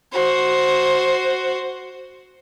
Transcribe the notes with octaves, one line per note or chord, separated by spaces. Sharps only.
F#4 C5